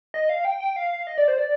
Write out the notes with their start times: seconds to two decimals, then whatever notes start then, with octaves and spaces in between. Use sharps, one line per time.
0.14 D#5
0.29 F5
0.45 G5
0.60 G5
0.76 F5
1.07 D#5
1.18 D5
1.28 C5
1.38 D5